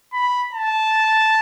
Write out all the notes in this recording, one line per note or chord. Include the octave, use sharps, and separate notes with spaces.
B5
A5